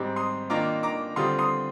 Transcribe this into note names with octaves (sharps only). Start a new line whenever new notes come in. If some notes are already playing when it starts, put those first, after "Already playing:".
Already playing: G#2 G3 C4 D6
C6 D#6
D#3 A#3 D4 F4 A#5 D6
A#5 D6
D3 G3 C4 F4 C6 D#6
C6 D#6